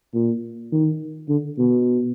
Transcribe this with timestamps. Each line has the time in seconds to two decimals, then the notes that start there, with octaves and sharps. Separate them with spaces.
0.14 A#2
0.72 D#3
1.29 D3
1.59 B2